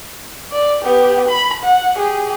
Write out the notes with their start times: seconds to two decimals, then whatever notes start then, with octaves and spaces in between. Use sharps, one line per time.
0.52 D5
0.84 B3 G4
1.29 B5
1.63 F#5
1.96 G4 G#4